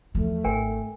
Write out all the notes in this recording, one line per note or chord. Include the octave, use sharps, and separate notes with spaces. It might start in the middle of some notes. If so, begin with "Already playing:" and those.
E2 F3 A3
G#1 A#4 G5 G#5